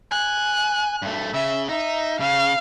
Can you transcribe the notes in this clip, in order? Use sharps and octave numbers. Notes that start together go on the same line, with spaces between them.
G#5 F#6
G2 A3
C#3 E5
D#4 E5
C#3 F5